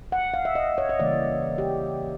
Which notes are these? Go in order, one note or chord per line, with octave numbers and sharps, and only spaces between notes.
F#5
F5
E5
D#5
C#5
D#5
C#3 E3 G3 A#3 D5
G4